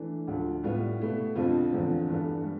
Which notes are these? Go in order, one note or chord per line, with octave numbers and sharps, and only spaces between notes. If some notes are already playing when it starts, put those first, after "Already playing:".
Already playing: E3 A3 D4
D2 D3 F3
A2 G3 B3 F4
B2 A3 E4
F2 D3 F3 C4 F4
E2 D3 F3 C4
G2 E3 B3 D4 A4
G3